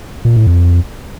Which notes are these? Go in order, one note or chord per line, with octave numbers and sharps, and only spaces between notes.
A#2
A2
F2